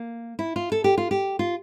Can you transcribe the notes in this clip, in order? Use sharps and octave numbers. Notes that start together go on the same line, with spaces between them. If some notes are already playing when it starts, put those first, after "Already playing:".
Already playing: A#3
E4
F4
A4
G4
F4
G4
F4